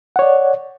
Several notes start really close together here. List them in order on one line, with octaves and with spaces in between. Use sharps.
F#5 C#5 D5